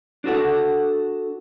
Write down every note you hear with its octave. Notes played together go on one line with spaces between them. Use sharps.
D4 F#4 A4 F#5